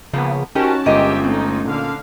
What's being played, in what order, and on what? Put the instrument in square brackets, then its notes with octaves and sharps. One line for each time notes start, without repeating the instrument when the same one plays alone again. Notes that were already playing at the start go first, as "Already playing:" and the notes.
[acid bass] C#3 [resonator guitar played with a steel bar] F3 A#3 B3
[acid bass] C#4 [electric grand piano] D#4 E7 [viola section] F#4 A5 [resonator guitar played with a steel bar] G4 A#4 C5
[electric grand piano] G1 G#3 F4 [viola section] G4 E5 [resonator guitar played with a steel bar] A#4 D#5
[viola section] A3 D#4 [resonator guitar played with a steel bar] C4
[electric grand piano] A#2 [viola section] D3 F5